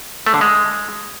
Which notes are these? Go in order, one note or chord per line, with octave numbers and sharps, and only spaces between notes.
A3
D3
G#3